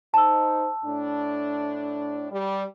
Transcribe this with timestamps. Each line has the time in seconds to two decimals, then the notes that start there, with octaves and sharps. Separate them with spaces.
0.14 D#4 C5 A5 E6
0.84 A2 D4
2.31 G3